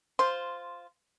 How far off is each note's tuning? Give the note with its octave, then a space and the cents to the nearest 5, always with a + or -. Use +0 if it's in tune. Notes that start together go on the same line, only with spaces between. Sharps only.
F4 +0 C5 -5